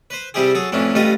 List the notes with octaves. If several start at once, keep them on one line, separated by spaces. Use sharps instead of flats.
B4 C5
C3 G3 C4 E4 G4 G#4
F#3 G#4 A4
A1 F2 E3 C#4 D4 E4
A1 G3 A3 F4 B4 D#5